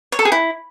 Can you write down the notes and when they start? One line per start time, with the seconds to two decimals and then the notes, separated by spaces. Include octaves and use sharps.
0.12 C#5
0.19 A4
0.25 G#4
0.32 E4